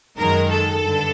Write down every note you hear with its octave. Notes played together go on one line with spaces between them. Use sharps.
F#2 D#3 G#3 A#4
A4
G2 D3